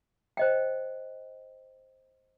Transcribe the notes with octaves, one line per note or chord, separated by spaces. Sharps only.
C5 D#5 G5